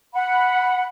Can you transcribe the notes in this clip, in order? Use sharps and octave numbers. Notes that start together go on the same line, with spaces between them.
F#5 B5